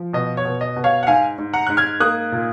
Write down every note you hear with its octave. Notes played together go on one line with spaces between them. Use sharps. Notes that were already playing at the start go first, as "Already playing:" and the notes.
Already playing: F3
B2 D#5
C#5
B2
D#5
B2
C#5 F5
F#5
G#2 F5 G#5
G#2
F#5 A#5
G#2 F#6
F6 G#6
A#3 D#6 F#6
A#2